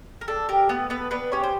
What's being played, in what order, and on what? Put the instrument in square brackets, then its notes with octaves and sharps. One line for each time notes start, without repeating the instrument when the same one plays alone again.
[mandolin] A#4
D4 A4
G4 A#4
A3 B3 B4
A3 B3 B4
B3 D4 B4
C#4 G4 C#5
C5